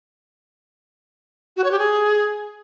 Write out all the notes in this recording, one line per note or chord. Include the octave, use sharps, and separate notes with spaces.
F#4
C#5
G4
G#4